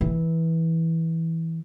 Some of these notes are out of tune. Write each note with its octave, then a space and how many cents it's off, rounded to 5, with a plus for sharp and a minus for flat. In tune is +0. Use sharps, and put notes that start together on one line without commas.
E3 -15